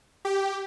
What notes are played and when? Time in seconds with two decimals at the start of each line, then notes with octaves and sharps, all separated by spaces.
0.25 G4